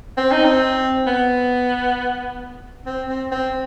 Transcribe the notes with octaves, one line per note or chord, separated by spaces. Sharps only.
C4
D#4
C4
B3
C4
C4
C4